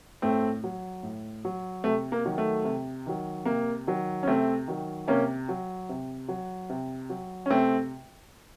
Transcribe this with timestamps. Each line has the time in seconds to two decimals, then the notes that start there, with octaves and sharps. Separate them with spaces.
0.22 A2 A3 C4
0.64 F#3
1.03 A2
1.45 F#3
1.84 C3 A3
2.12 A#3
2.25 D#3 F#3
2.38 A3
2.65 C3
3.06 D#3 F#3
3.46 C3 A#3
3.87 D#3 F#3
4.23 C#4
4.27 C3 A3 C4
4.68 D#3 F#3
5.07 C3 A#3 C#4
5.49 F#3
5.89 C3
6.28 F#3
6.70 C3
7.10 F#3
7.46 C#4
7.50 C3 A3 C4